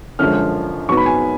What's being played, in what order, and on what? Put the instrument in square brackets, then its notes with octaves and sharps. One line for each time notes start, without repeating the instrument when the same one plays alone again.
[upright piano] F#2 D3 F3 G#3 F6
G#2 F#3 B3 C#6
B5
G#5